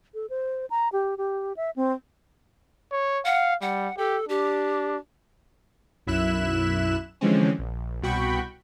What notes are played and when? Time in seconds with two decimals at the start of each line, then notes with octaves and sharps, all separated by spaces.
0.14 A4
0.30 C5
0.70 A#5
0.93 G4
1.18 G4
1.57 E5
1.76 C4
2.92 C#5
3.25 F5 F#5
3.62 G3 F#5
3.98 G4 A4
4.29 D4 G4
6.07 B1 F#2 E4 E5 F#6 E7
7.21 D3 E3 F3 G#3 C4 C#4
7.59 A#1
8.02 C2 B2 F#4 G5 B5 C#6